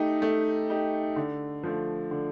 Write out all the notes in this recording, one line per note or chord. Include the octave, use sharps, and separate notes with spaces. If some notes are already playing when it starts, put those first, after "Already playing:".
Already playing: A3 D#4 G4
A3
D#4 G4
D3
F3 A3
D3